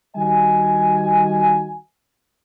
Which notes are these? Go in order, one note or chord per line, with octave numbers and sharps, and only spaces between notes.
D#3 G3 F#4 D#5 G#5